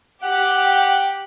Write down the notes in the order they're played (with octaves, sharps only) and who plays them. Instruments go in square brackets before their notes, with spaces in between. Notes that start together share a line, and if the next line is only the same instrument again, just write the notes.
[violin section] G4 [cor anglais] F#5